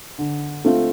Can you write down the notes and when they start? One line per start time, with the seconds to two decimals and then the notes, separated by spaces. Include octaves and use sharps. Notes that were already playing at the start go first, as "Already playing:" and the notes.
0.18 D3
0.65 A3 C4 F4